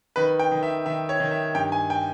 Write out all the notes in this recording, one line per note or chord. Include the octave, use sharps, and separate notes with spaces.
D#3 B4
G5
D#3
E5
D#3 E5
C#5
D#3
E5
G2 G5
G#5
G5